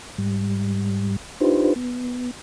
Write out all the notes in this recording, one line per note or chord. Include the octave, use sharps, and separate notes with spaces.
G#2 G3
D4 D#4 F4 G4 B4 C5
B3